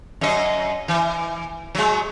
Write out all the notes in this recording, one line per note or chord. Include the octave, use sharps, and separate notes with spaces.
F#2 D#5
E3
F#3 G#3